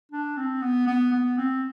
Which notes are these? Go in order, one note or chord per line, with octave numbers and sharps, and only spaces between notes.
D4
C4
B3
B3
B3
C4